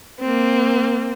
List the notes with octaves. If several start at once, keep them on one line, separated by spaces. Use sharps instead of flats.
A#3 C4